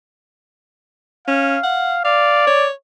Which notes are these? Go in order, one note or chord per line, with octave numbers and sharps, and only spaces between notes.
C#4 F5
F#5
D5 F5
C#5